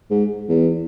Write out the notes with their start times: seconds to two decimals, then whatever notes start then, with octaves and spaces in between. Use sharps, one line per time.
0.10 G#2
0.48 E2